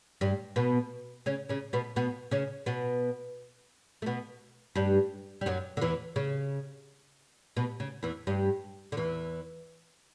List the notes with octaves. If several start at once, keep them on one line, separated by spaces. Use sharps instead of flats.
G2 G3
B2 B3
C#3 C#4
C#3 C#4
B2 B3
B2 B3
C#3 C#4
B2 B3
A3
B2 B3
G2 G3
G3
F#2 F#3
D3
E2 E3
C#3
B2
C#3
E2 E3
G2 G3
D3
E2 E3